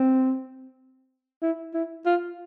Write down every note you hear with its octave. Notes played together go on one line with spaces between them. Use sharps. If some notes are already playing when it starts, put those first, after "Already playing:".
Already playing: C4
E4
E4
F4